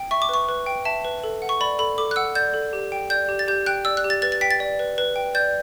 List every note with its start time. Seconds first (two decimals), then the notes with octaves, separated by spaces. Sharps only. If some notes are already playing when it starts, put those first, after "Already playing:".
Already playing: G5
0.11 E5 C#6
0.22 D6
0.29 B4 C#6
0.49 B4
0.66 G5
0.85 E5 A5
1.05 B4
1.24 A4
1.42 F#5
1.49 C#6
1.61 D5 B5
1.79 A4 B5
1.98 A4 D6
2.11 F#6
2.16 F#5 E6
2.35 D5 G6
2.54 A4
2.73 G4
2.92 G5
3.10 D5 G6
3.29 G4
3.39 A6
3.48 G4 G6
3.66 G5 F#6
3.85 D5 E6
3.97 F#6
4.04 G4
4.10 A6
4.22 B4 A6
4.32 A6
4.41 G5 B6
4.51 A6
4.60 D5
4.79 B4
4.98 B4
5.16 G5
5.35 D5 G6